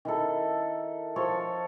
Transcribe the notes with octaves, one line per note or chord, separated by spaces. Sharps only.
D#3 E4 A4
F3 A4 C#5